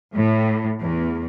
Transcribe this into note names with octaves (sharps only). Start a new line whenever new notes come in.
A2
E2